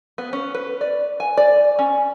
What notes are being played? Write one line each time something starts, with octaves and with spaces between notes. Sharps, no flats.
B3
C#4
B4
D5
G#5
D5
C#4